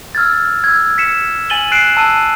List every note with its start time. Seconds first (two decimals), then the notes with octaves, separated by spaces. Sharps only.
0.15 E6 F6 G#6 A6
0.64 E6 G#6
0.98 B6 C#7 E7
1.50 G#5 A6 D#7 F#7 G7
1.72 F#6 C7 D7 E7
1.97 A5 E6 D#7